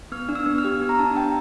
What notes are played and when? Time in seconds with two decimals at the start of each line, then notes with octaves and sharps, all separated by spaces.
0.12 B3 F6
0.29 D4
0.35 E6
0.46 B3
0.58 F6
0.64 G4
0.82 B3
0.89 A#5
0.99 D4 A5
1.16 B3 G5